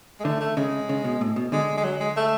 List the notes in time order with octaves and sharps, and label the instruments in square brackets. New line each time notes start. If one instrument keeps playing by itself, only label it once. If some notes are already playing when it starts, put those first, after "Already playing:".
[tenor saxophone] G#3
[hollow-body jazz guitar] D3 [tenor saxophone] A3
[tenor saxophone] A3
[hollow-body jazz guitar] C#3 [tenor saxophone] G#3
[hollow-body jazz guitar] C#3
B2
A2
B2
[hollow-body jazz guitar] D3 [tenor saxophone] G#3
[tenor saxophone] G#3
F#3
G#3
A3